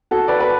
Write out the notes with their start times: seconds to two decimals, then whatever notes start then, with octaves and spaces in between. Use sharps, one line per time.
0.11 F#4 A4
0.28 B4 D5
0.40 B4